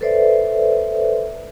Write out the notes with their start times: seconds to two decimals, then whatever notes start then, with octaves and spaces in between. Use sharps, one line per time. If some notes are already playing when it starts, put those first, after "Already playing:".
0.01 A4 B4 C5 D5 E5